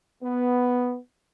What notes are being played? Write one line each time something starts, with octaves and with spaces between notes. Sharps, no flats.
B3